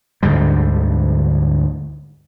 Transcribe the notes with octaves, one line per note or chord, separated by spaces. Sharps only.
D2 G#2 D3 G3